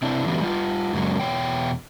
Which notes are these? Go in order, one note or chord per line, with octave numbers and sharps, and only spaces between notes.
C3 C4 D4 E4
D3 E3 F#3 G3 A#3 B3
G3 F4
F#2 C#3 F#3 G#3 A#3 C#4
E2 B2 C#5 G5